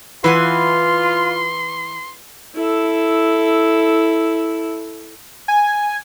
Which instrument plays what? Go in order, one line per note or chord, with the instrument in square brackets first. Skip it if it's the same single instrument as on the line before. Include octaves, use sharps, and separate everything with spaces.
[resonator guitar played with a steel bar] E3 [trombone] F4 [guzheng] B4 F#5 G#5 [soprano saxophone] C6
[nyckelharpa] E4 A4
[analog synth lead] G#5